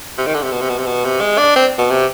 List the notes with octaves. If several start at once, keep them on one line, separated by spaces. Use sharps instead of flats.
C3
D#3
D3
C3
B2
C3
B2
C3
B2
C3
G#3
D4
C4
B2
C3